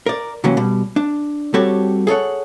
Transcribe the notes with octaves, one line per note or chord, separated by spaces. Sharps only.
A#4 D5
C3 E3 F#3 A#3 C#4
B2 G3
D4
G3 C4 F#4 G4 A4 C#5
G#4 A4 C#5 F#5